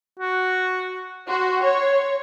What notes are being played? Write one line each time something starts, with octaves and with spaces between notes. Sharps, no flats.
F#4
F#4 C6
C#5